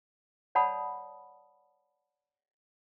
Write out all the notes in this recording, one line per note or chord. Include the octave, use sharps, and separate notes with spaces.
C#5 D5 F#5 A5 B5 D#6